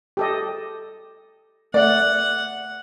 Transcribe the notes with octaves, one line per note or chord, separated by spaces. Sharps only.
G4 A4 D#5
A3 D5 F#5